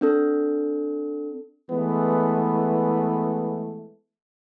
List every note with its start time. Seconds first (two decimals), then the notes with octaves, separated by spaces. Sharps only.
0.01 C4 D4 A4
1.71 E3 G#3 A3 B3